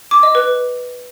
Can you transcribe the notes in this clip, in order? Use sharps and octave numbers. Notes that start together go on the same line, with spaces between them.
D6
D#5
B4